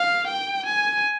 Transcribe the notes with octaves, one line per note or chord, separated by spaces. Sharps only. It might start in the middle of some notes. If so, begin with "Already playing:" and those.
Already playing: F5
G5
G#5